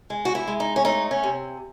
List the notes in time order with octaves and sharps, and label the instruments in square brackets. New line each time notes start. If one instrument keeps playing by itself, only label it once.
[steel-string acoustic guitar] G#3
F#4
E4
G#3
D#4
C#4
A3 D#4
C#4
C3